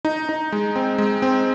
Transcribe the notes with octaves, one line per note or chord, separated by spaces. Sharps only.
D#4
D#4
G#3
C4
G#3
C4